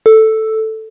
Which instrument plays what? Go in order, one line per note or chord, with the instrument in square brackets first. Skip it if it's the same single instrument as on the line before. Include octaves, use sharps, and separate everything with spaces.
[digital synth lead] A4